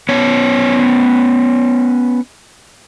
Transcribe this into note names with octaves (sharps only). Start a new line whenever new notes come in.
B3 C#4 C#5